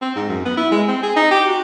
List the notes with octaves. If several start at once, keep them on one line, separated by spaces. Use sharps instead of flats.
C4
G#2
F#2
B3
E4
G#3
C4
G#4
D#4
G4
F#4